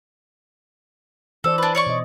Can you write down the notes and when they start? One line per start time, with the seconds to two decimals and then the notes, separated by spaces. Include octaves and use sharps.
1.44 E3 A4 C5 D5
1.58 D4 B4
1.75 C#5 D5 C#6
1.87 B2 D#5